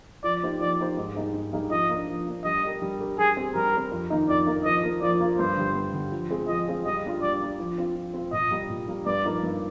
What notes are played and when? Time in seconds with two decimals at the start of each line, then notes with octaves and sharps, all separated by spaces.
0.24 F3 D5
0.43 A#3 D#4 G4 C5
0.61 F3 D5
0.80 A#3 D#4 G4 C5
0.97 G#2
1.15 G3 A#3 D#4 G#4
1.34 G#2
1.53 G3 A#3 D#4 G#4
1.71 F3 D#5
1.89 A#3 D4
2.08 F3
2.27 A#3 D4
2.45 G3 D#5
2.63 D4 G4 A#4
2.82 G3
3.00 D4 G4 A#4
3.18 G3 G#4
3.37 C4 G4
3.55 G3 A#4
3.73 C4 G4
3.92 F2
4.10 D#3 A#3 D#4 A#4
4.28 F2 D5
4.46 D#3 A#3 D#4 A#4
4.65 F3 D#5
4.83 A#3 F4 A#4
5.01 F3 D5
5.20 A#3 F4 A#4
5.38 G2 C5
5.56 D3 G3
5.75 G2
5.94 D3 G3
6.12 F3
6.30 G#3 C4 F4 G#4
6.48 F3 D#5
6.67 G#3 C4 F4 G#4
6.86 G3 D#5
7.04 A#3 D4 F4
7.22 G3 D5
7.41 A#3 D4 F4
7.59 F3
7.78 C4 F4
7.95 F3
8.14 C4 F4
8.33 A#2 D#5
8.51 G3 A#3
8.70 A#2
8.87 G3 A#3
9.06 G2 D5
9.24 F3 A#3 D#4 A#4
9.43 G2